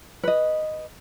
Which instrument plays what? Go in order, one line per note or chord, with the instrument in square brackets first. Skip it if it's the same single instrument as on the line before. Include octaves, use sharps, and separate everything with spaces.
[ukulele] B4 D#5